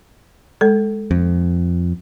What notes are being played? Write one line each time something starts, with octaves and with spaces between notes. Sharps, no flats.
G#3 A4
F2